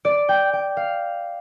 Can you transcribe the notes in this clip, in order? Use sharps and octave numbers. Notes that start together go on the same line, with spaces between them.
D5
G5
G5
F5